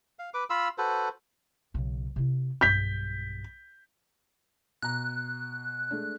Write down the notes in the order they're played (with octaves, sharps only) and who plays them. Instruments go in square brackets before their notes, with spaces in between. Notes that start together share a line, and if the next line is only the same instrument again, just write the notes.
[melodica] F5
B4 D6
F4 F5 B5 E6
F#4 A4 B4 C5
[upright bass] B1 C#3
C3 E4
[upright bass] B1 G2 [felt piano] G6 B6
[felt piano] B2 A#5 [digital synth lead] F#6
[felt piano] G#3 A3 D4